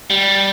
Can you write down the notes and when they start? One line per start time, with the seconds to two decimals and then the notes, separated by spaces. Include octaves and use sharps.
0.10 G3